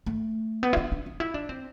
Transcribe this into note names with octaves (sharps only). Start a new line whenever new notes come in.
A3
B3
E4
D4
D4
D4
E4
D4
C4